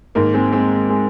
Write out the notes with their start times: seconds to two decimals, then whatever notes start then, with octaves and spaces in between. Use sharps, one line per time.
0.15 G#2 D#3 A#3
0.34 G#3 C4
0.53 G#3 C4
0.90 G#3